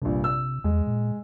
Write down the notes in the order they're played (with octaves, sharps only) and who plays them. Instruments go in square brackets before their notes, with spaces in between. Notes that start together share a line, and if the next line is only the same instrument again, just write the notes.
[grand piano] A#1 G2 [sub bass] C3
[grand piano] E6
[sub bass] E2 [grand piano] G#3
[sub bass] A#2